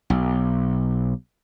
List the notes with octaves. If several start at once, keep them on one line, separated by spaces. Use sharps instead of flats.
B1